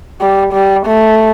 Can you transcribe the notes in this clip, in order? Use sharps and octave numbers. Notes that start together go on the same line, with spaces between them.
G3
G3
A3